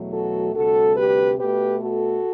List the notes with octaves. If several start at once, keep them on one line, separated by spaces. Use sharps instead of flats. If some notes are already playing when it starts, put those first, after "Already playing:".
Already playing: E2 B2 F#3 A3
F#4 A4
D2 C3 G3 F#4 A4
G4 B4
B2 A3 G4 B4
F#4 A4